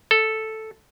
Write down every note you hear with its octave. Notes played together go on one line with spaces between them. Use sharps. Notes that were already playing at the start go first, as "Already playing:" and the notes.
A4